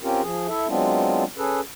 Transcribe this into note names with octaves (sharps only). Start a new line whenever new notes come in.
C4 C#4 F4 G4 A#4
F3 G#4
E4 A4 E5
F#3 G#3 B3 C4 D4 F4
C#4 G#4 A4 B4